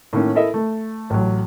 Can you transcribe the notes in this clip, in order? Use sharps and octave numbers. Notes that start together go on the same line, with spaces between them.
A2 D#3 A#3 C#4
E4 A4 A#4 D#5 E5
A3
A1 F#3